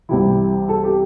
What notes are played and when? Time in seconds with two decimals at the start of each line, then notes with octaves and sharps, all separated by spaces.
0.09 C2 C3 E3 E4
0.69 A4
0.84 G4